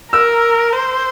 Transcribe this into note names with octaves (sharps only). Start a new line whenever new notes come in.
A#4 E6
C5